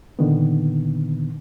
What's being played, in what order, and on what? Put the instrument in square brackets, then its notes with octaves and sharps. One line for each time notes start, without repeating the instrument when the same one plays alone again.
[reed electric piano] A#2 D3 D#3 B3